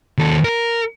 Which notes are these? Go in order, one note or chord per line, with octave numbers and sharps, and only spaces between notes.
D#2 A4
A#4